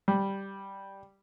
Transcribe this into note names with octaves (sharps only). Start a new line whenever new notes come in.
G3